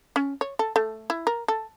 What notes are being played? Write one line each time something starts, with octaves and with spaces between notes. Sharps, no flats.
C#4
C#5
A4
A3
E4
A#4
A4